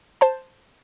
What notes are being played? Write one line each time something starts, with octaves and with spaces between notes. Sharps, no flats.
C5 A5